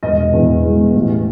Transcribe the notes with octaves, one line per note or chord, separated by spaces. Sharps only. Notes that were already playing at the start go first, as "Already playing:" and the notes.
E1 D#5
E2
G#3
A1